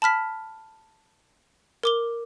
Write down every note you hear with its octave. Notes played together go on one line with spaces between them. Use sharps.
A5 B5 F6 B6
A#4 D6 G7